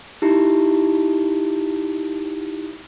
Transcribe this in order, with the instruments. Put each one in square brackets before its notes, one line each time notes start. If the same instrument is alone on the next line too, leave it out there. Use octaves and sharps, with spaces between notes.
[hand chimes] D#4 E4 G4